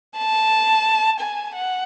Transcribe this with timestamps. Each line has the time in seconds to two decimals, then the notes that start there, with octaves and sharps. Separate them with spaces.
0.18 A5
1.20 G#5
1.55 F#5